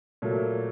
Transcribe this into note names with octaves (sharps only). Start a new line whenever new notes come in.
A#2 F#3 A3